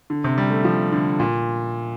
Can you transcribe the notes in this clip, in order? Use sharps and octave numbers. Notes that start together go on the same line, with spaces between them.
D3
C3
G3
A3
F3
D3
A#2